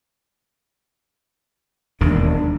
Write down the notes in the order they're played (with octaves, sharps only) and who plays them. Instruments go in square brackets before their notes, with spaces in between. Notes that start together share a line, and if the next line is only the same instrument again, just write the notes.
[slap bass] E1 D#2 D#3 [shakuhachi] D4